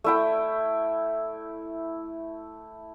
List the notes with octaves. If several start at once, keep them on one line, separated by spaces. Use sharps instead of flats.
A3 E4 G5